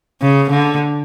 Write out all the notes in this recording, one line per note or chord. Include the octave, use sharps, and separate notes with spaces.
C#3
D3